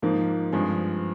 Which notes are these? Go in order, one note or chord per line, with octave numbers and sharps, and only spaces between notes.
G#2 F3 A#3 D#4
G2 F3 G#3 C4